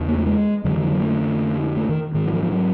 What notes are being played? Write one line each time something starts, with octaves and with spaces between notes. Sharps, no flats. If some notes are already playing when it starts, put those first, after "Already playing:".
Already playing: E2 C#3
A#3
A3
G#3
F2 D3 F#3
D#3
F3
F#3
A3
A3
D#3
G#2 D#3
F#3
F3
F3
F#3